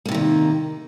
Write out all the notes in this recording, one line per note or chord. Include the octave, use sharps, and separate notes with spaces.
C3 D#3 E3 A#3